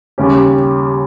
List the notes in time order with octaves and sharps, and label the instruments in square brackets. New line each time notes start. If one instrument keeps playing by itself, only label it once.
[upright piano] D#2 C#3 G3 C#4 G4